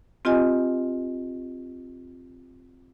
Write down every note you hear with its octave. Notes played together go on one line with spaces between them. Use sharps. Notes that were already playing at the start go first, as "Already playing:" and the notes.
C4 F4 G4 D#5 G#5